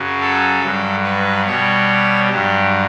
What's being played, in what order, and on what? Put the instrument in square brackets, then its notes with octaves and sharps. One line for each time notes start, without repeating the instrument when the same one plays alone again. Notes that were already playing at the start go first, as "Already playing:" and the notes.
Already playing: [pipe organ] F#2 C#3 F#3
A4
G2 F#3
B4
B2 G3 C#5
G2 F#3 G4